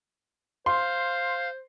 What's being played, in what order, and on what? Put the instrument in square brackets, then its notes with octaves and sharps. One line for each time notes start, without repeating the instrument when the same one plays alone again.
[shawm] C5 [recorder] F5 [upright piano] C6